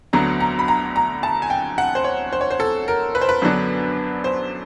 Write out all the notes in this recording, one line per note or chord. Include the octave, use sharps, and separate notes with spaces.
D2 D3 F#3 B3 A#5
A#5
B5
A#5
A#5
A5
G#5
G5
F#5
C5
C#5
C5
C#5
C5
A4
A#4
B4
C5
B4
F#2 D3 F#3 B3 D4
C5